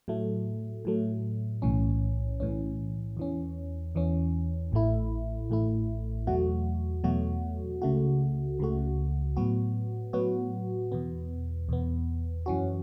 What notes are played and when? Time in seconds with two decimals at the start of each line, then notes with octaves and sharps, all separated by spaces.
0.08 A2 F#3 A3
0.85 A2 F#3 A3
1.62 B1 A2 E3 C#4
2.40 B1 A2 E3 C#4
3.17 E2 E3 C#4
3.95 E2 E3 C#4
4.72 A1 A2 A3 E4
5.50 A1 A2 A3 E4
6.27 E2 B2 F#3 A3 F#4
7.04 E2 B2 F#3 A3 F#4
7.82 C#2 C#3 A3 F#4
8.59 C#2 C#3 A3 F#4
9.37 A2 F#3 B3 F#4
10.13 A2 F#3 B3 F#4
10.92 E2 B2 B3
11.69 E2 B2 B3
12.46 F#2 E3 C#4 F#4